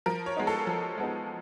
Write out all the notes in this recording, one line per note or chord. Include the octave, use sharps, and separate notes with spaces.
F3 A#4
C#5
G#3 B3 D#4
A4
F3
G#3 B3 D#4